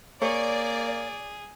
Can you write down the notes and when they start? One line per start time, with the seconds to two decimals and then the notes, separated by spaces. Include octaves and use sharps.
0.22 A#3 G#4 C#5 D5